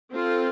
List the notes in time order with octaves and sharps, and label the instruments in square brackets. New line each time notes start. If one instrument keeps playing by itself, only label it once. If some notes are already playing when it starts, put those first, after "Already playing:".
[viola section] C4 F4 A4